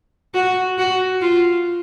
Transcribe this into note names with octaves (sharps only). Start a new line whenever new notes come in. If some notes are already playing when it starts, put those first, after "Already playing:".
F#4
F#4
F4